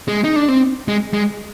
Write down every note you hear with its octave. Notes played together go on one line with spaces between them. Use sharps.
G#3
D#4
D4
C4
G#3
G#3